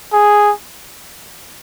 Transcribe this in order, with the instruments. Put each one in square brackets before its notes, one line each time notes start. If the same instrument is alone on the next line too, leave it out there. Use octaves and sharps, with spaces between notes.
[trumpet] G#4